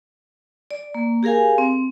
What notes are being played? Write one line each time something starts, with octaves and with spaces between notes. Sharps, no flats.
D5
A#3
G4 G#4 A#4 F5 G#5
C4